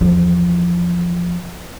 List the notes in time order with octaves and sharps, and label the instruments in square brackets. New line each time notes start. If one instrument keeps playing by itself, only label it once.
[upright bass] E2 F3